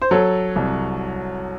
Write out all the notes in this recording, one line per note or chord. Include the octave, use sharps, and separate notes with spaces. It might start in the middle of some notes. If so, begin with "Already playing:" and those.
C5
F#3 A4 C#5
C2